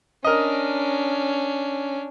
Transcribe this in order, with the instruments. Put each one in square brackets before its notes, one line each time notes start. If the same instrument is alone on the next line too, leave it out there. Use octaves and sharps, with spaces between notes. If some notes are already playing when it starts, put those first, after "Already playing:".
[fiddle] C#4 D4 [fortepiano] A#4 D#5